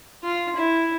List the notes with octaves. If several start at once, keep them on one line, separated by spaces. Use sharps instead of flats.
F4
E4